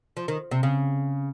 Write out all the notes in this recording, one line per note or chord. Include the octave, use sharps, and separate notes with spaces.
F3
D#3
C3
C#3